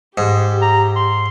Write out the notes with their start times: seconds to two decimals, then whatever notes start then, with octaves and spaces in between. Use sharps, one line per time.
0.18 G#2 G4
0.62 A#5
0.96 C6